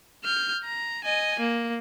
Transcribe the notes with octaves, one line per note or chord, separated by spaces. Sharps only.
F6 G6
A#5
D#5 G#5
A#3